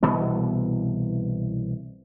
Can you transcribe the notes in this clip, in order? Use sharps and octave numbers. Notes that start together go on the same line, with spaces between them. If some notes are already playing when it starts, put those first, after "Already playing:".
C2 B2 E3 B3